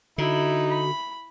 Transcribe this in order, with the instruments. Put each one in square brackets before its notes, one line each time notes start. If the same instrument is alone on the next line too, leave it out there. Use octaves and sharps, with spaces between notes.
[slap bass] D3 [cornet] D#4 [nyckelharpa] E4 B5 [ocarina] F#4
[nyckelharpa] B5